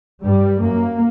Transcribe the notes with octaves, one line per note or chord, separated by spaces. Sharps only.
G2 G3
F#2 A#3